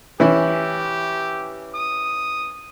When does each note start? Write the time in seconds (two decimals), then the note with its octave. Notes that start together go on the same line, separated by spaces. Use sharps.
0.20 E3 C#4 E4 G4
1.75 D#6